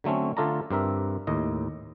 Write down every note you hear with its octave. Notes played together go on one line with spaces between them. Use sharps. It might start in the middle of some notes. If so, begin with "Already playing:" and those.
D3 F#3 A3 C4 C#4
D3 A3 F4 A4 D5 A#5
G2 C4 A#4 E5
D#2 A2 D#5